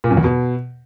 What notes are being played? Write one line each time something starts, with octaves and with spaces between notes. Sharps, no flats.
A#2
F#2
E2
B2